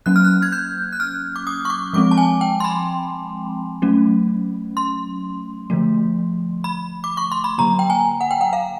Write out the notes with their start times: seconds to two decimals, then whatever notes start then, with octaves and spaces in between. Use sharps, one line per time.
0.06 F#3 A#3 C#4 F#6
0.16 F6
0.24 F#6
0.42 G#6
0.52 G6
0.92 F#6
1.00 F6
1.36 D6
1.47 D#6
1.65 C#6
1.70 D6
1.93 F3 G#3 C4 D6
2.11 A5
2.18 G#5
2.41 G5
2.60 C6
2.64 B5
3.82 F#3 A3 C#4
4.77 C6
5.70 D3 F3 A3
6.64 B5
7.04 D6
7.17 C#6
7.32 C6
7.44 B5
7.58 D3 F#3 A#3 A#5
7.79 G5
7.90 G#5
8.21 F#5
8.31 G5
8.41 F#5
8.53 F5